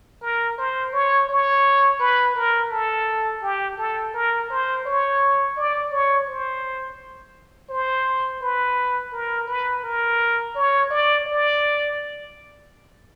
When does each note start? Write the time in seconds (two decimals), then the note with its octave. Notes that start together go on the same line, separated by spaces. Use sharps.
0.22 A#4
0.58 C5
0.93 C#5
1.29 C#5
2.00 B4
2.36 A#4
2.71 A4
3.42 G4
3.78 A4
4.14 A#4
4.50 C5
4.85 C#5
5.57 D5
5.91 C#5
6.27 C5
7.69 C5
8.42 B4
9.13 A#4
9.47 B4
9.83 A#4
10.55 C#5
10.91 D5
11.26 D5